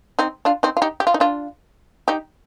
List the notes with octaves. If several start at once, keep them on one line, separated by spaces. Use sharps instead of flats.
C4 D#4
D4 F4
C4 D#4
F4
D#4 G4
G4
F4
D#4
D4 F4
D#4 G4